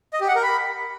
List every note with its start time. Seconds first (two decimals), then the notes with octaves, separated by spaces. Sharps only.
0.13 D#5
0.21 G4
0.28 F#5
0.35 A#4
0.43 B5